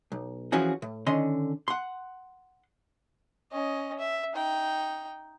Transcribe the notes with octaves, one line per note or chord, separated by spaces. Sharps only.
B1
E3 F3 C#4 F#4 G#4
A2
D3 D#3 C#4 D#5 C6
F#5 C6
C#4 D#5
E5
D#4 G5